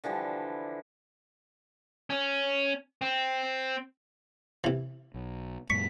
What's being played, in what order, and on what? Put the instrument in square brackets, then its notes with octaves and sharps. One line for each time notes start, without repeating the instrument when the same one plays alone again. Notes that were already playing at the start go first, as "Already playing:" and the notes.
[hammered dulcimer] D3 E3 F3 G3
[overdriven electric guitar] C#4
C4
[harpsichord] C3 E3
[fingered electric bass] B1
[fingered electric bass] F#2 A#2 G#3 [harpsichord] C#6 [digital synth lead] B6